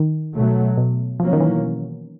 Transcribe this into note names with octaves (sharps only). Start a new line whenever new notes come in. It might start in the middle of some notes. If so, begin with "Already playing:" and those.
Already playing: D#3
B2 F#3 A3
B2
B2 F3 F#3 A#3 C#4
D#3
E3